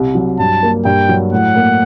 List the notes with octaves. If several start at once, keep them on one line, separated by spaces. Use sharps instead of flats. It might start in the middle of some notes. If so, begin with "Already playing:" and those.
Already playing: C2
F#3
G2 A5
A#3
G2 G5
F#3
A2 F#5
A#3